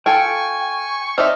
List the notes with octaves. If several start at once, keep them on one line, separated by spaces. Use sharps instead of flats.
F4 A4 G5 G#5 C#6
C4 D#4 D5 E5 F6